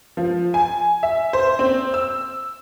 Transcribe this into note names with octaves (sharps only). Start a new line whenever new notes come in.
F3
G#5
E5
C5
C4
E6